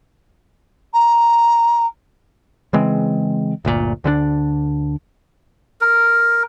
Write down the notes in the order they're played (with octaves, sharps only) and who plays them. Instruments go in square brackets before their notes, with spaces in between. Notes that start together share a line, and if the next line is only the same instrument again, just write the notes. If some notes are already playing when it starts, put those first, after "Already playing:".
[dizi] A#5
[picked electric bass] C#3 E3 G#3 C4
G1 D2 A#2
D2 D3 F#3 D4
[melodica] A#4